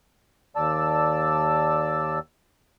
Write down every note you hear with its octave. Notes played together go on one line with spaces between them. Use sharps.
D#2 D5 A5 E6